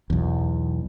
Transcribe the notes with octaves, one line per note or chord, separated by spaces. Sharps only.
B1 E2